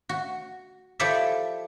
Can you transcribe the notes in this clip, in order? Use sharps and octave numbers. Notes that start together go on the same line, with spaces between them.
F#4
F3 E4 G4 A4 D5 E5